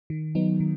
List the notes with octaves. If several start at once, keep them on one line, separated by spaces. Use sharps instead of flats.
D#3
F#3 B3 D#4
D#3